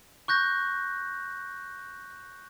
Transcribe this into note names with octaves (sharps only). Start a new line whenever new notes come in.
C#6 F#6 G6 A#6